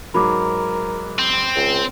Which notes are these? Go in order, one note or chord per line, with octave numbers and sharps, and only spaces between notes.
G#2 F#3 A#4 B5 D6
C4
C#2